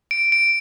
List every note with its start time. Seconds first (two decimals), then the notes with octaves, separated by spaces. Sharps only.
0.11 D7
0.32 D7